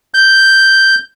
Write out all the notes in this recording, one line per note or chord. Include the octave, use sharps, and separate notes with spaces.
G6